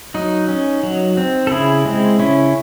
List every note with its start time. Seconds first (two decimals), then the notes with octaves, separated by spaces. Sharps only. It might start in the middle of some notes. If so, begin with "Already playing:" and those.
0.14 F#3 D#4
0.48 C#4
0.83 F#3
1.17 C4
1.47 A4
1.51 C#3 E4 G#4
1.85 G#3 C4
2.19 C#3 C#4 E4